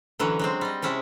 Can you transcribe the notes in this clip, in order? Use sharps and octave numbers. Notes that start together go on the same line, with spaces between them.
D3 E3 F#3 C#4
F#3 G#3 C4
G3 D#5
C3 G#3 C#4 E4